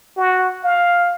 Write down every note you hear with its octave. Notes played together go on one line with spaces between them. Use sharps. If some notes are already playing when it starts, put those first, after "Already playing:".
F#4
F5